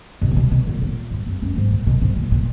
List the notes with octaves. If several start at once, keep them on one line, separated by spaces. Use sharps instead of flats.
B2
A#2
B2
B2
A#2
A#2
G#2
F#2
F#2
G#2
A#2
B2
G#2
A#2
A#2